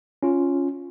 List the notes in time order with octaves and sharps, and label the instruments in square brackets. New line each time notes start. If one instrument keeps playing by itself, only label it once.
[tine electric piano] C#4 F4